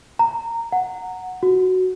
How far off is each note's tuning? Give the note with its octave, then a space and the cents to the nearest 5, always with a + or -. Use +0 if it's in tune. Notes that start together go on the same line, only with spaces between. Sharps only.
A#5 -15
F#5 -5
F#4 +0